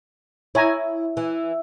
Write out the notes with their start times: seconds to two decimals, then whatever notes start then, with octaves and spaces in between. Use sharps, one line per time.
0.55 E4 C#5 G#5 A#5
1.17 E3